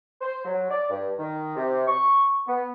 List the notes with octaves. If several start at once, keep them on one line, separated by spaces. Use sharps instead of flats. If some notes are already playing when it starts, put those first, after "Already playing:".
C5
F#3
D5
G2
D#3
C3
C#6
B3